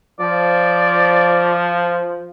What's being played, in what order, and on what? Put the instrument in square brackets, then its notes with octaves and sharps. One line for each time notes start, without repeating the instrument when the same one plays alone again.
[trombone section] F3 [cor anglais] D5